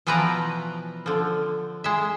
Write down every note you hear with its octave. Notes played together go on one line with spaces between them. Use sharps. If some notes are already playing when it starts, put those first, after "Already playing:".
B2 E3 F3 B4 D5 A#5
D3 F3
G#3 E5